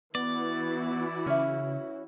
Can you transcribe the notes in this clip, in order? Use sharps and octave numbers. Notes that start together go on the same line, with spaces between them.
E3 B3 E4 F#4 D5
C#3 C#4 E5